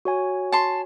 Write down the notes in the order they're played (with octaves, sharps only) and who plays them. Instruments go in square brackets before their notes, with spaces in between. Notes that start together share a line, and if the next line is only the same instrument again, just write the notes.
[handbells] F#4 C#5 G#5
[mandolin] A5 C6